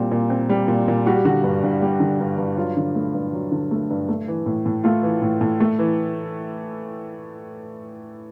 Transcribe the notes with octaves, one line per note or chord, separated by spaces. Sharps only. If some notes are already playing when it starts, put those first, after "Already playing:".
Already playing: A#2 G3 C4
A#2
C4
G3
A#2
A#2
G3 F#4
G4
D3 F#4
G2
G2
G3
D3
G2
G2
F#3 F4
D3
A3
G2
F#3
D3
A3
G2
A3
E3
A2
A2
A3 F4
E3
A2
A2
A3
E3